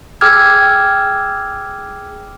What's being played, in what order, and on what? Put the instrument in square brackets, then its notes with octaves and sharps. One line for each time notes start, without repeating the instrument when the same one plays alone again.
[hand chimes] G#4 G5 D6 E6 F6 G#6